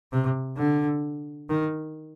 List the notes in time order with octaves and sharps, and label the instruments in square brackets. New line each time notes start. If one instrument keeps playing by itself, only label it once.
[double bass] C3
D3
D#3